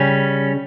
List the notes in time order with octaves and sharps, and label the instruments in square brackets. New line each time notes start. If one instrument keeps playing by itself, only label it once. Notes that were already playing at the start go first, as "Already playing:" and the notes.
Already playing: [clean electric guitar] C#3 G3 C#4